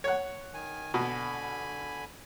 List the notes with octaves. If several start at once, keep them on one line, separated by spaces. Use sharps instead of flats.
C#5 F#5
D#3 G#5
B2 D3 G#5 B5